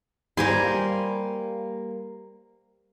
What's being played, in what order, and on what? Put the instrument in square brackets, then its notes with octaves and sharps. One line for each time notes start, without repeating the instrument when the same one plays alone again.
[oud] G3 A#3 [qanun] C5 G#5 C6